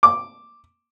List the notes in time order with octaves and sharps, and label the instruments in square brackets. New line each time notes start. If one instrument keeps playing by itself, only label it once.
[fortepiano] D6